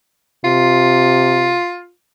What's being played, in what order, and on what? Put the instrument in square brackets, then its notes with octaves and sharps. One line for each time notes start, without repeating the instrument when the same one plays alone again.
[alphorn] C3 [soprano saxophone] F4